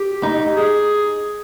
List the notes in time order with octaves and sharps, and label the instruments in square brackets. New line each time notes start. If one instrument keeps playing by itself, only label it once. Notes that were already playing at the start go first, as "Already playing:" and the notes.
Already playing: [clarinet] G4
[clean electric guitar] D#4
[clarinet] G#4